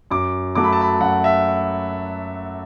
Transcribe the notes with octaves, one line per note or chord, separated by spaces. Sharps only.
F#2 D6
F#3 A3 D6
B5
A5
B5
F#2 F#5
E5